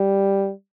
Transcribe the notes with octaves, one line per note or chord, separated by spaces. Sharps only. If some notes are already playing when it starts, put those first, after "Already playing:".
Already playing: G3